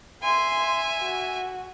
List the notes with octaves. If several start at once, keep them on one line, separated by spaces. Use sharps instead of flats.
E5 G#5 C6
F#4